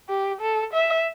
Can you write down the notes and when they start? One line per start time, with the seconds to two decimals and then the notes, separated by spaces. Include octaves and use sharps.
0.09 G4
0.41 A4
0.73 E5